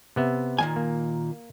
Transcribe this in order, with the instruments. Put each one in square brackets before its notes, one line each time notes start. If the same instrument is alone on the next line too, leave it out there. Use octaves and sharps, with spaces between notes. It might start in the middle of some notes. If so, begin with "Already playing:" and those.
[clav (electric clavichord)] C3 B3 E5
[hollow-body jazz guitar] A#2 D#3 G#5
[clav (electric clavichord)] A#3